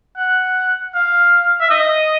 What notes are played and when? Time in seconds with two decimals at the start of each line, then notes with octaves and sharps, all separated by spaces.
0.17 F#5
0.95 F5
1.61 E5
1.71 D#5